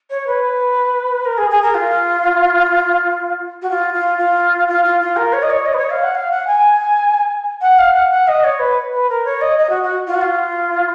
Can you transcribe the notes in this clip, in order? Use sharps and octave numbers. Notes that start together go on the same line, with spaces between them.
C#5
B4
A#4
G#4
G#4
A#4
F4
F#4
F4
F4
F4
F4
F4
F4
A#4
C#5
D#5
C#5
D#5
B4
C#5
F5
F#5
F5
F#5
G#5
F#5
F5
F#5
F#5
D#5
C#5
B4
B4
A#4
C#5
D#5
D#5
F#4
F#4
F4
F#4
F4